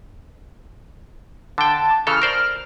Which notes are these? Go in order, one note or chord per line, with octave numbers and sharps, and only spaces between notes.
D3 G5 A5
C#3 E3 A4 F6
A#4 C5 D5